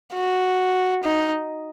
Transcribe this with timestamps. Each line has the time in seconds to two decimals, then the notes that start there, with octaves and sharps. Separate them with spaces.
0.14 F#4
1.03 D#4